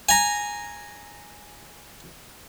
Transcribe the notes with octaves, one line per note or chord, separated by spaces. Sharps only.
G#5 A#5